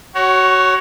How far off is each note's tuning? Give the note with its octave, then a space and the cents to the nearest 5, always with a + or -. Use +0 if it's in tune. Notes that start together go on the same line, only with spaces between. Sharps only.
F#4 +20 C#5 +0